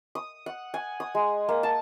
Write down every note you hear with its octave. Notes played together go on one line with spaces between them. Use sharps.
D#6
F#5
G#5
D#6
G#3
A#3
A5